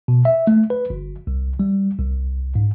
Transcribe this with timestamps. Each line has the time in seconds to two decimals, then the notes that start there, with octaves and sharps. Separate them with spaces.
0.08 B2
0.25 E5
0.47 A3
0.70 B4
0.90 G1
1.27 C2
1.59 G3
1.98 C2
2.55 G#2